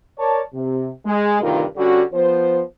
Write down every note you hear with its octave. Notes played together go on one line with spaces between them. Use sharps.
A#4 C#5 D5 A5
C3
G#3
D2 G2 C3 D#3 F4 A#4
D3 G3 C#4 F#4
F3 B3 C5